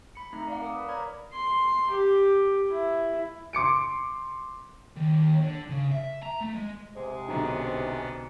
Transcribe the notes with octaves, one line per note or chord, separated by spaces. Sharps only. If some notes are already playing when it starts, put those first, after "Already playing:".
B5 C#7
A3 C4 D#4 A#5
D5 F5 F#5
A#4 D6 D#6
B4 B5
C#5 D5 A#5 B5 F6 G#6
C6
G4
E4
C6 D6 C#7 D7
D#2
D3
C#3
E5
A#5
A3
G#3
G#2 C3 G#3
B1 D3 B3 C#4 D4 A#5